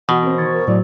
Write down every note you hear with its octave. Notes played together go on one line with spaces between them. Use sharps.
B2 E3 F#4 F#5
C4 A#4 C5
D#3 C#6 G#6 A6
A#4
A2 F#3 D5